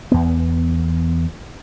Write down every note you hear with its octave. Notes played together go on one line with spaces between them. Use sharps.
E2 B3